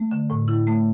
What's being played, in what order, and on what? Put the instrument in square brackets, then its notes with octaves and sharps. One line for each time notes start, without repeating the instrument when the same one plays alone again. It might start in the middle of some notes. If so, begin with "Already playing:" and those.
Already playing: [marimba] A3
D3
A2
E4
A3